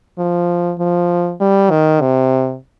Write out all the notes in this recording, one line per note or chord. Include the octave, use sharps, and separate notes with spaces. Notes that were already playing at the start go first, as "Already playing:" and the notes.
F3
F3
G3
D#3
C3